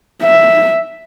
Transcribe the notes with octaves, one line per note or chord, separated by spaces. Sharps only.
E5